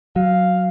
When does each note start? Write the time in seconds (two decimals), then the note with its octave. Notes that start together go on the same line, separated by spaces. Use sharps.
0.16 F#3 F5